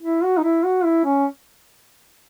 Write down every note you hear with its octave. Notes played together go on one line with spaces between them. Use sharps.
E4
F#4
D#4
E4
F#4
E4
C#4